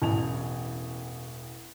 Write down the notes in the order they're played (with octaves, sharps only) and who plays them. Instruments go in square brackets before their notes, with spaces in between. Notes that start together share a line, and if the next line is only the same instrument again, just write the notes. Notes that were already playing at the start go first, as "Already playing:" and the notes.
[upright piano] E1 A1 G#5 F7